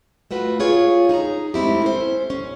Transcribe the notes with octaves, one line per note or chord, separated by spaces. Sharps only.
A3 F4 F#4 B4
F4 G#4 C#5
D#4 G#4 A5 A#5
G#3 A3 C4 E4 G4
C#4 A4 C5
C#4